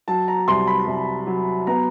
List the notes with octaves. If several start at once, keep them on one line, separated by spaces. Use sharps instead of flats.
F#3 A5
A#5
C2 C6
B5
C2
F#3
B3 A#5